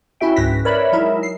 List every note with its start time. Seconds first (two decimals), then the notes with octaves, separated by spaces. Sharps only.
0.21 C#4 E4 F#4 E5 G5
0.36 C#2 G#2 B4 A#6 B6
0.65 A#4 B4 C#5 D5 E5 B5
0.92 F#3 G#3 D#4 E4 A#4 E5
1.23 C7